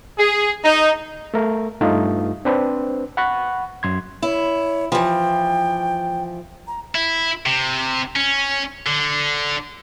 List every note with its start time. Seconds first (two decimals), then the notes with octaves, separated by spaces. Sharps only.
0.18 G#4
0.65 D#4
1.34 A3 A#4
1.81 G2 A3 D#4 F4
2.45 C4 D4 B4 C5
3.17 F#5 B5 C#6 F#6
3.83 F#2 C6 G#6
4.22 E4 C#5
4.92 E3 F3 G5
6.67 A#5
6.95 E4
7.46 C3
8.16 C#4
8.86 D3